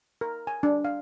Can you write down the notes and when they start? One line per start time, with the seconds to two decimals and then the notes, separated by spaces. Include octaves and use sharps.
0.21 A#4
0.47 G#5
0.63 D4
0.85 F5